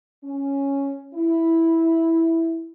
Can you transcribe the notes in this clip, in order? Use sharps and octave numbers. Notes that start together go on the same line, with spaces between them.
C#4
E4